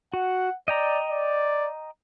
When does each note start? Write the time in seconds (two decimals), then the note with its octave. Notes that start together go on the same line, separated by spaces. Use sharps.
0.14 F#4 F#5
0.68 D5 D#5 G5 A#5
1.10 D5